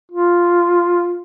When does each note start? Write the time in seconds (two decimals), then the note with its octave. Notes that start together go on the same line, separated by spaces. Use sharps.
0.11 F4